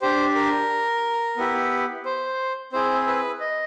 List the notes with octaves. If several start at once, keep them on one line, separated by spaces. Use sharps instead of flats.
D4 G4 C5
A#4
B3 E4 G4
C5
C4 E4 G#4 C5
B4
D#5